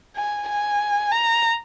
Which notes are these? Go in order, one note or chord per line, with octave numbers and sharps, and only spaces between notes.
G#5
G#5
A#5